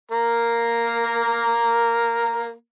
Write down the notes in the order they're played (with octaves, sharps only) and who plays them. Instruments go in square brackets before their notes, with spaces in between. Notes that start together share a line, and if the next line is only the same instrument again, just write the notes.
[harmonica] A#3 A#4